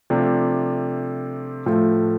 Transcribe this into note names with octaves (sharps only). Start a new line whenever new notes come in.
C3 F3 A3 D4
A2 F3 A3